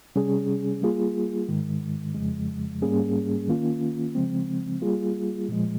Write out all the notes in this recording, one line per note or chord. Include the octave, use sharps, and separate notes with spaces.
C3 G3 C#4 G#4
G3 A#3 F4 G#4
G#2 D#3 G#3
F2 C#3 F3 G#3
G#2 G3 A#3 C#4 G#4
D#3 A#3 C#4 F4
C#3 F3 G#3 C4
G3 A#3 F4 G#4
A#2 F3 G#3